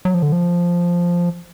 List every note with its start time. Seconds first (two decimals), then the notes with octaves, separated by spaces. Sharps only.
0.05 F#3
0.14 F3
0.22 D3
0.32 F3